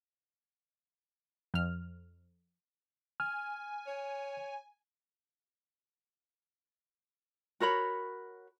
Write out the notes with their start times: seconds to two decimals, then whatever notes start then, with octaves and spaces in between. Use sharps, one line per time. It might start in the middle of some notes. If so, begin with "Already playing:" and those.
1.54 F2 F6
3.20 G#5 F6
3.87 C#5
7.60 F#4 A#4 C#5 B5